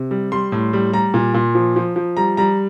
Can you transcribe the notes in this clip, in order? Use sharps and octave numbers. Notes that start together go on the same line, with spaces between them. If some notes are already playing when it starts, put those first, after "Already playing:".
Already playing: C3
G3
G3 C6
A2
G3
G3 A#5
A#2
A#2
F3
F3
F3
G3 A#5
G3 A#5